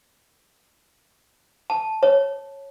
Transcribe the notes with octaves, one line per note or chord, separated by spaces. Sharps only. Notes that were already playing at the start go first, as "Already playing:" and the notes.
A5
C#5